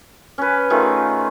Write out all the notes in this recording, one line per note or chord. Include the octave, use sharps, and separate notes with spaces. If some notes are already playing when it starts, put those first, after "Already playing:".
C#4 B4
D#3 A3 F4 G#4